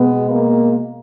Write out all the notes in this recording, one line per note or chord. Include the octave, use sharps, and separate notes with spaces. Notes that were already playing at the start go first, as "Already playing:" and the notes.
Already playing: B2 G#3 B3
A#3